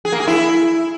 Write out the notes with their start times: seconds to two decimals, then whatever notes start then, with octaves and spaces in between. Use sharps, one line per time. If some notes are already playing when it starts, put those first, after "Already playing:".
0.05 G#4
0.12 A#3
0.20 G#4
0.27 E4